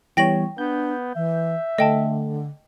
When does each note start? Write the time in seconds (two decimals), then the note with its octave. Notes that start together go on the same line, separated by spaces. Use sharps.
0.17 E3 G3 B3 C#5 G5 A#6 F#7
0.58 B3 D4 G6
1.16 E3 E5
1.78 D3 A3 D#5 G5 A5